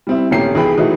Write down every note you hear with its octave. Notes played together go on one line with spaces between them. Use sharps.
G3 C4 E4
D#1 A3 C#4 G4 A#5 C7
B1 E3 G#4 G5 B5
E3 F#3 A3 D#4